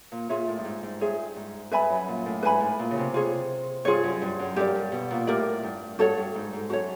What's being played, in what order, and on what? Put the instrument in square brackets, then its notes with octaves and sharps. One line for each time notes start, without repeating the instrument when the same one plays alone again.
[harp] A#2
[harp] A#2 [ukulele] F4 G#4 C#5 E5
[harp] A2
G2
G#2
G#2
[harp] G2 [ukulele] F4 G#4 C#5 E5
[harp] G#2
[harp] G2 [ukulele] B4 E5 G#5 B5
[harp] F#2
A#2
A2
[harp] G#2 [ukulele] B4 E5 G#5 B5
[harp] A2
A#2
C#3
C3
[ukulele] F4 G#4 C#5
[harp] G2 [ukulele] F4 G#4 C#5
[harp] F#2
G2
F#2
[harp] G2 [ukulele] G4 A#4 D5
[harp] G2
B2
A#2
[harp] A2 [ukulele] G4 A#4 D5
[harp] G2
[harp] G2 [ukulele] F#4 A4 C#5
[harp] G2
G#2
G#2
[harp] F#2 [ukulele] F#4 A4 C#5